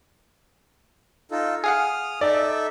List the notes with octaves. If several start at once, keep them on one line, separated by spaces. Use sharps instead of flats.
D#4 F4 A4
G#4 F5 F#5 D#6 F6
D#4 A4 D5 E5